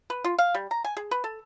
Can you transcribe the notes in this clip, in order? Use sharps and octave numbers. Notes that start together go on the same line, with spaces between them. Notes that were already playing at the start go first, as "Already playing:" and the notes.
B4
F4
F5
G3
A#5
G#5
G#4
B4
A4